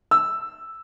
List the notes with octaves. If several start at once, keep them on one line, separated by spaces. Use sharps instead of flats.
E6